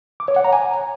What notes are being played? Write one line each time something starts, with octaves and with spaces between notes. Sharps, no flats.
D6
C#5
F#5
A#5
G#5